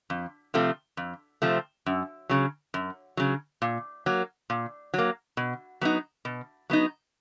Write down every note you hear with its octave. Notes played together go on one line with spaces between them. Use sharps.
F2
C3 F3 A3 C4
F2
C3 F3 A3 C4
F#2
C#3 F#3
F#2
C#3 F#3
A#2
F#3 A#3
A#2
F#3 A#3
B2
F#3 B3 D#4
B2
F#3 B3 D#4